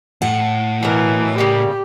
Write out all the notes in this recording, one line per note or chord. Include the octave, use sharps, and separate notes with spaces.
A2 F#5
B2 E3 F#3 A#4
C#3 G3 A#3 G4